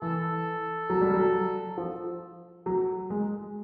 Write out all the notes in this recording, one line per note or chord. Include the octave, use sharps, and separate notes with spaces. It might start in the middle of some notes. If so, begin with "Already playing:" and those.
E3 A4
F#3
G3
F#3
F3
F#3
G#3